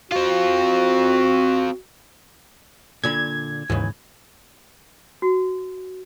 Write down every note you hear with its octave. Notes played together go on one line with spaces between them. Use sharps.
C4 F4 F#4
A#2 D3 B5 G#6
D#2 G#2 C#3 E3
F#4